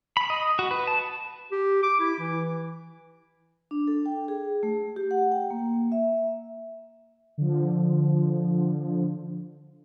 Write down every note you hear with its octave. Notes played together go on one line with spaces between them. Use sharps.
B5
D#5
F#4
B4
A5
G4
D6
E4
E3
D4
A4
G5
G#4
A3
G4
F#5
G5
A#3
E5
D3 F3